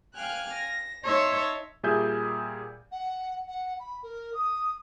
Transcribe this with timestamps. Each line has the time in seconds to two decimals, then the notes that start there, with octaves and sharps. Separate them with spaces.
0.14 F5 G5 G#5 F6 F#6
0.53 A#6
1.03 D#4 C#5 E5 A5 C6
1.83 A#2 G3 G#4 E5 G#5 G6
2.92 F#5
3.48 F#5
3.80 B5
4.03 A#4
4.34 D#6